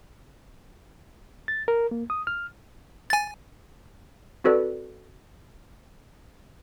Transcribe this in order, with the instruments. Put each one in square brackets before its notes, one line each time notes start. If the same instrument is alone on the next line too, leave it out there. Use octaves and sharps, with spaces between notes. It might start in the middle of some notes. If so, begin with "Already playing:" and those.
[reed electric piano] A6
A#4
A#3
D#6
F6
[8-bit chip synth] G#5 A6
[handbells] C4 F#4 A4 B4 D5